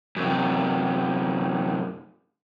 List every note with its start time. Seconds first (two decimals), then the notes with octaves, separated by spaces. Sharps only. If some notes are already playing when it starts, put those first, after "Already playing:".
0.16 F#2 C3